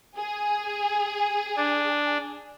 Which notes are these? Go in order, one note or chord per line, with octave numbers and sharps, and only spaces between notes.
G#4
D4